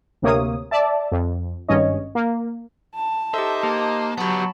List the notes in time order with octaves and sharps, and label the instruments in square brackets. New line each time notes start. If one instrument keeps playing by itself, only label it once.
[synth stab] D2 C3 A#3 C#5 D#6
D5 E5 A5
F2
G#1 G2 C#4 C#5 D#5
A#3
[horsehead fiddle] A5
[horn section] D#4 C5 D#5 [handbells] G4 A4 [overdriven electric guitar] E5
[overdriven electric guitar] A#3 [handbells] G4
[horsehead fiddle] F#3 [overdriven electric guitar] B3 G4 [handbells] A5 B5